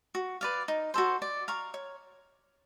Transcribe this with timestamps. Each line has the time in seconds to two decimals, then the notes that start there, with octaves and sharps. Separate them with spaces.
0.15 F#4
0.41 B4 D5 F5
0.68 D#4
0.94 F#4 A4 C5
1.22 D5
1.48 F5 A#5 C#6
1.74 C#5